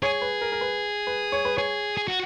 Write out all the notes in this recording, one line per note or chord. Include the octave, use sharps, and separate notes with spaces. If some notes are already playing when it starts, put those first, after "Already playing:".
G#4 C#5
B4
A#4
A#4
B4
B4
C#5
B4
G#4 C#5
G#4
F#4